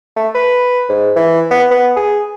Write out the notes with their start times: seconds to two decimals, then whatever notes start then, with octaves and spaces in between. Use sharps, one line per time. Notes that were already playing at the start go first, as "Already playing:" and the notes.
0.17 A3
0.35 B4
0.89 G#2
1.16 E3
1.51 B3
1.71 B3
1.96 G#4